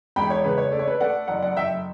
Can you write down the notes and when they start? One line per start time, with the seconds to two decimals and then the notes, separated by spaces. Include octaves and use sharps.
0.16 E1 G5 B5
0.30 C#5
0.44 C#3 B4
0.58 C#5
0.72 A3 D5
0.79 C#5
0.88 B4 D5
1.00 A3 D5 F#5
1.28 F#1 D5 F#5
1.42 D5 F#5
1.56 F#1 E5 G5